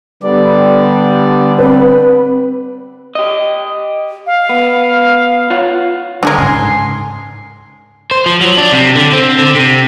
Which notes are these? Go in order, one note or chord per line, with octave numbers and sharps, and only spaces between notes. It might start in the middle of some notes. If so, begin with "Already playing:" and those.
D3 G3 B3 D4 D5
C4 B4
G4 D#5
F5
B3
F4 C#5 F#5
D3 G3 G#3 D4 G#4 A#4
G#2 C#3 G#5 C6
C5
F3
F#3
D4
C3
D3
C4
D3
C3